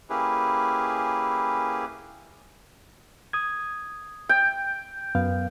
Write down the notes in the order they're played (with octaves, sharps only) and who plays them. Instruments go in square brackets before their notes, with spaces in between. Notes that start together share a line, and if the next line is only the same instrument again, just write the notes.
[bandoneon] A#3 C#4 E4 G4 G#4 B4
[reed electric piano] D#6 G#6
[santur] G5
[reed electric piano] F#2 B3 F5